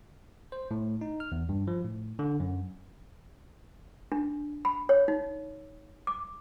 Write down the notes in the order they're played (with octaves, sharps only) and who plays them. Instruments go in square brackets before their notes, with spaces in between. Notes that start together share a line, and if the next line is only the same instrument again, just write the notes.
[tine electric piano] C5
A2
D#4
F6
E2
G2
F3
A2
D3
F#2
[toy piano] D4
B5
C#5
D#4
D6